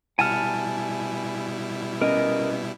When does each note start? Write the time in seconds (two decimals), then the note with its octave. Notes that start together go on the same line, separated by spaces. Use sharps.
0.19 B2 G3 E4 F#5 G#5 A5 F6
2.01 B3 C#4 A#4 D#5